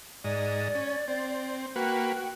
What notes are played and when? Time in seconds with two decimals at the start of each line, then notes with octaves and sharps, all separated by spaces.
0.24 G#2 D5 D#5
0.75 C#4
1.08 C4
1.76 A#3 F#4 B4 G5
2.16 F#4